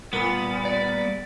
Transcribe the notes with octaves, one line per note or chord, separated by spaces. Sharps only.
A#2 G3 B3 B5 A6
D5